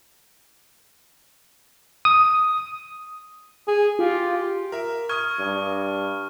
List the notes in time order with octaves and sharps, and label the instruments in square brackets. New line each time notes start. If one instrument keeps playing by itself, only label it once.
[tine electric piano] D#6
[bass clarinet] G#4
[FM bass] F4 [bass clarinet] G4
[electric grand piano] A#4 E5
[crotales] C#6 F6 [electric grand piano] D#6 G#6
[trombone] G2